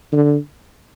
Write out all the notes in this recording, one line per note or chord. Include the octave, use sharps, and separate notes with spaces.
D3